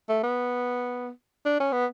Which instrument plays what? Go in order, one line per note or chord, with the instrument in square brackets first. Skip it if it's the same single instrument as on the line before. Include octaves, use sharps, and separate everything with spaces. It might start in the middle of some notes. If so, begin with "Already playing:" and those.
[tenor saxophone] A3
B3
D4
C#4
B3